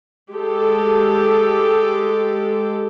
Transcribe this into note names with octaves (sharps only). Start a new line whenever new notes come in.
G#3 G4 A4